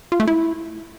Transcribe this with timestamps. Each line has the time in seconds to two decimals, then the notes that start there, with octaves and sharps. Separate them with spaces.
0.12 F4
0.20 A3
0.27 E4